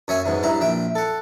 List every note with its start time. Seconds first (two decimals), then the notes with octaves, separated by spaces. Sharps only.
0.08 F#2 C#5 E5 G#5
0.26 G#2 B2 F#3
0.43 G2 E4 A#5
0.60 A#1 E5 G5
0.95 A4 F#5